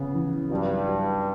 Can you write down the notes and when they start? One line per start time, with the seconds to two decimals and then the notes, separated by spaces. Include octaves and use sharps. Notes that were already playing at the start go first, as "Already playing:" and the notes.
Already playing: C#3 B3
0.15 E3
0.50 G2 F#3
0.86 G4